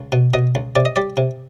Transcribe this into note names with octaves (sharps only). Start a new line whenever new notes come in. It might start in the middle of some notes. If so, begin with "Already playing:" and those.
Already playing: C#2
B2
B2 D#5
C#2
C3 D5
D#5
G3 D5
C3